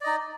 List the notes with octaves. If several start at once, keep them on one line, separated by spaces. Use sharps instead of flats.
D#4 D5 D#5